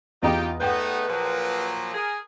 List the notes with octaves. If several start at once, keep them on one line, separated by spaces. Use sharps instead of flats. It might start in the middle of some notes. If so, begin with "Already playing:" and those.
E2 D#4 F4 G4 D#5 G5 A#5
A3 B3 D#4 B4 F#5 G5 G6
A#2 F3 F#3
G#4 A#4